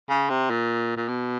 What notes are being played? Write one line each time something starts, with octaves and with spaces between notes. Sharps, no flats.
C#3
C3
A#2
A#2
B2